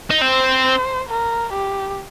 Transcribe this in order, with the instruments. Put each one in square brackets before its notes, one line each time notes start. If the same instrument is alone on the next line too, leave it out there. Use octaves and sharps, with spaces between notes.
[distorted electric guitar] D#4
[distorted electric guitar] C4 [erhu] C5
[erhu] A#4
G4